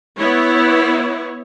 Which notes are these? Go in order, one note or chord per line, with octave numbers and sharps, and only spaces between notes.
B3 E4 C#5